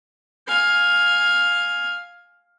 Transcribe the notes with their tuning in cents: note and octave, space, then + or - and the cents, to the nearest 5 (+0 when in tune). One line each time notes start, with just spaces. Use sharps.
F5 +10 G#5 +0